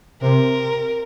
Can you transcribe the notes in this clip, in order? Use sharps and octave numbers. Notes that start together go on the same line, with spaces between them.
C3 A#4